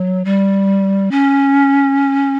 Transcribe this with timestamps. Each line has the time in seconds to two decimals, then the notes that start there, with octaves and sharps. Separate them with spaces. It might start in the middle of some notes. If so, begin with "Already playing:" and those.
Already playing: F#3
0.25 G3
1.11 C#4